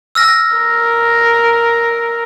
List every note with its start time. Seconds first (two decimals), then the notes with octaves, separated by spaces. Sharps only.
0.15 E6 F6 A#6
0.56 A#4